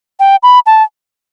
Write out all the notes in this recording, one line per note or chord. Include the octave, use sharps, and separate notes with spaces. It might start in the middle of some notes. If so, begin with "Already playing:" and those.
G5
B5
A5